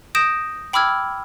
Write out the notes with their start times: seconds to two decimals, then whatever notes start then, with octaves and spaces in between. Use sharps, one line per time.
0.15 D#6 G6 A#6 D7 E7
0.73 G5 B5 D6 E6 F6 G#6